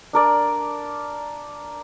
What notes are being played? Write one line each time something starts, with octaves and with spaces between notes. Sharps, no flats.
D4 A#4 D5